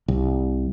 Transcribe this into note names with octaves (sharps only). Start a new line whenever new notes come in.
C2